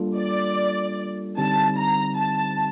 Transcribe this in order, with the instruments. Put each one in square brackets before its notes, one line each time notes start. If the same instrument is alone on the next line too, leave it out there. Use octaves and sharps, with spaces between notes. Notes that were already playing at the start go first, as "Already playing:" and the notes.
Already playing: [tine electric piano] G3 A#3 D4 F4 A4
[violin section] D5
[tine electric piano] D3 G3 C4 D#4 G4 [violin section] A5
[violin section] A#5
A5